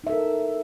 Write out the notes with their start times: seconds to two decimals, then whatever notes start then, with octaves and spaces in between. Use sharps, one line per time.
0.04 D#4
0.07 E5
0.10 A4
0.12 A#4